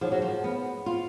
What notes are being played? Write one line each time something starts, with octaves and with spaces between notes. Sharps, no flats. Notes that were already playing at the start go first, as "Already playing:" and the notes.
F3 D#4 G#4 C#5 F#5
F#3
F3
B3
F4